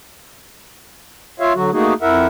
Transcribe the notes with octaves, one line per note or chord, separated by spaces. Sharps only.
F4 C#5 E5 F5
D3 F#3 F#4
A3 A#3 D#4 F#4 G#4
F2 E4 A#4 E5 F#5